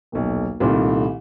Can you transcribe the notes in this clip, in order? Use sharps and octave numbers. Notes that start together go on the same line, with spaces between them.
D#1 B1
C2 A#2 D#3 A3